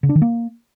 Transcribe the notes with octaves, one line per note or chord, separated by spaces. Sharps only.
C#3
D4
D#3
A#3